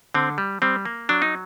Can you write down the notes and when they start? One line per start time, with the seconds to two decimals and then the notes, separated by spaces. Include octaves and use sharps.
0.14 D3 C4
0.38 G3
0.62 G3 C4
0.85 A#3
1.09 F#3 D4
1.22 D#4